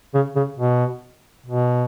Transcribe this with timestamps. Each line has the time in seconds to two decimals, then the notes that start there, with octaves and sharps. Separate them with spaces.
0.14 C#3
0.36 C#3
0.58 B2
1.46 B2